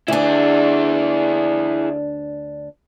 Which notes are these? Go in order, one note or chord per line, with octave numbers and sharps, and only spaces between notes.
D2 D4 E4 G#4